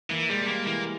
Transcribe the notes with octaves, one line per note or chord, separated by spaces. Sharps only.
E3 A#3
G3 G#3
G3 A#3
E3 A#3